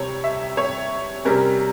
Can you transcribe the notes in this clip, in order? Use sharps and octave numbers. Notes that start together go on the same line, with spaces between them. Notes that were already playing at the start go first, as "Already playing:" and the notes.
Already playing: C2 C3 G3 C4 C#5
E5
C#5
C3 G3 C#4 A#4